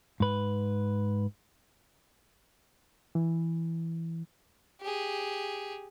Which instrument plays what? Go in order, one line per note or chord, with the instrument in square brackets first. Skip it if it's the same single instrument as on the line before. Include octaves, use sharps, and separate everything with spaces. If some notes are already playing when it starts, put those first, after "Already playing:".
[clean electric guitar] G#2 B4
[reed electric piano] E3
[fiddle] G4 G#4